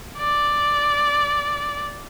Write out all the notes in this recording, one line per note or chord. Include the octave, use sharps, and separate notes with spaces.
D5